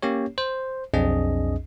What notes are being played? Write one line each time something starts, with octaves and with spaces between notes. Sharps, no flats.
A#3 C#4 G4 C#5
C5
B1 F2 C4 D4 G#4 D#5